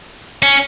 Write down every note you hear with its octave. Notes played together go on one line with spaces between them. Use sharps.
C#4